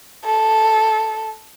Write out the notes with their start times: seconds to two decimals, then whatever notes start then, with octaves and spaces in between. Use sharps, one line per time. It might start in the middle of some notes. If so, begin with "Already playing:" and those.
0.25 A4